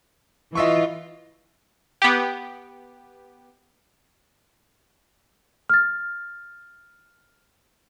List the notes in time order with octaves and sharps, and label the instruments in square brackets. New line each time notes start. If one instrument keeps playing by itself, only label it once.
[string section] E3 F4 [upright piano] D#5 E5 C#6
[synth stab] B3 G4
[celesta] F6 A6